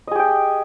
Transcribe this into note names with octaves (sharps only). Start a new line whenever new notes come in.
G4 G#4 D#5 G5